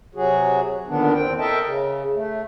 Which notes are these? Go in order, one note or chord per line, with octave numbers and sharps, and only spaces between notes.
C3 F#3 F#4 G#4
A#2 D3 D#3 B3 D4
E2 C4 G5
A4 A#4 D#5 E5 G5 A5
C#3
A3